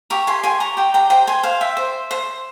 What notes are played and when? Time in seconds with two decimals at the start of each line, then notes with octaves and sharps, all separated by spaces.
0.10 G4 A#5 C#6
0.27 G#5 C6
0.43 G4 G#5 C6
0.60 A#5 C#6
0.77 G4 G5 A#5
0.94 G5 A#5
1.10 C5 G5 A#5
1.27 G#5 C6
1.43 C5 F5 G#5
1.61 E5 G5
1.77 C5
2.11 C5